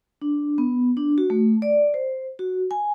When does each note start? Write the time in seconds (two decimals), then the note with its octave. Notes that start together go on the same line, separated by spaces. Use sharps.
0.22 D4
0.58 B3
0.97 D4
1.18 F#4
1.30 A3
1.62 D5
1.94 C5
2.39 F#4
2.71 G#5